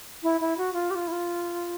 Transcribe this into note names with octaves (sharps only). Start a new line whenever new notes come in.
E4
E4
F#4
F4
G4
F4
E4
F4